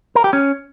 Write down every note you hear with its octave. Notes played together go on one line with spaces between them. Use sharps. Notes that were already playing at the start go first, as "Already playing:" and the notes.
A#4
G4
C#4